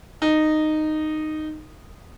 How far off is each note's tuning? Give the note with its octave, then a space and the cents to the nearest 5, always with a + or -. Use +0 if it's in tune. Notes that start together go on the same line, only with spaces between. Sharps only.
D#4 -10